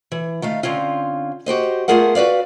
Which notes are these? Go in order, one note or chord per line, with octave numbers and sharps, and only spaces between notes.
E3
D#3 A3 F5
D3 C4 C#4 F4
F#4 G4 C5 D#5
A3 B3 F4 G#4 A#4 F#5
F#4 B4 D5 F5